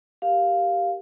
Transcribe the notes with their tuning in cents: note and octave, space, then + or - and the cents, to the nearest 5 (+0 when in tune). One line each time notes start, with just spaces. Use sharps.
G4 +0 A#4 +0 F5 +0